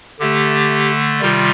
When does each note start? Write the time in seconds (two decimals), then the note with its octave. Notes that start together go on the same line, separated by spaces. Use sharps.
0.19 D3 A3 G4
1.21 C3 D#3 G3 F4